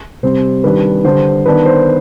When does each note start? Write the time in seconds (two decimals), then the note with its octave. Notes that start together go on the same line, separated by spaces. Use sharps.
0.23 C3 G3 C4 C5
0.64 D#3 G3 D4 B4
1.04 D3 G3 D4 C5
1.46 D#3 B3 D4 B4
1.65 C5